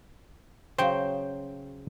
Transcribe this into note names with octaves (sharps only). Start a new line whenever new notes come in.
C#3 F#3 C5 G5